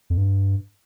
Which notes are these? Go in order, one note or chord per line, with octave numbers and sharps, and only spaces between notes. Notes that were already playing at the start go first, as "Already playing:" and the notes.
F2
G2